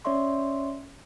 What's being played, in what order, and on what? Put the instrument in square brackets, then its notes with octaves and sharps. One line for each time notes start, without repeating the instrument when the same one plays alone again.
[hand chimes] C#4 C#5 D5 E5 C6 C#6